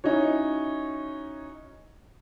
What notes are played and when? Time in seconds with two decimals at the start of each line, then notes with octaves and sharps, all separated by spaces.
0.04 C#4 D#4 E4 F#4 C#5